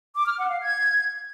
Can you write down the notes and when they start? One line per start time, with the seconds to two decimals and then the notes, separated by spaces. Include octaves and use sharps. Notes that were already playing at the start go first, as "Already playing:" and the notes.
0.16 D6
0.27 F6
0.39 F#5
0.50 F5
0.62 G#6